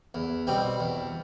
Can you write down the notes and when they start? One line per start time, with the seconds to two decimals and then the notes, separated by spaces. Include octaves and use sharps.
0.14 E2
0.47 B2 G3 C4
0.80 E2